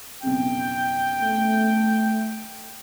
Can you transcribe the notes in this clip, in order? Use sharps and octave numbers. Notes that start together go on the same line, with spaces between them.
B1 F2 C#3 G5
A3